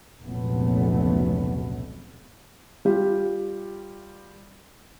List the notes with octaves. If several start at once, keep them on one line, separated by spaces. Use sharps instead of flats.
F1 C#2 A#2 F#3 A3 B3
G3 F4 G4